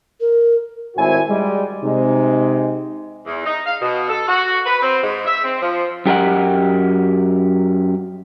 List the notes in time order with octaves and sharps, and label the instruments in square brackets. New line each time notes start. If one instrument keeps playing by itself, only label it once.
[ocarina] A#4
[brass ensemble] G#1 A2 C4 E4 F#4 G#5
G3 G#3
C3 G#3 D#4
[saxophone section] E2
D#4
F5
B2
A4
F#4
B4
C4
G#2
E5
C4
F3
[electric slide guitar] F#2 G4 A#4 D#5 F#5